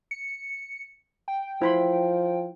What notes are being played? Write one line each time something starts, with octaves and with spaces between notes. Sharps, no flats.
C#7
G5
F3 E4 C5 B5 C6